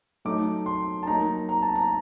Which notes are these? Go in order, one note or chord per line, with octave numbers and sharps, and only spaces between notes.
F#3 A3 D#4 D6
C6
A5
F#3 A#3 D#4 A#5
A#5
A5
A#5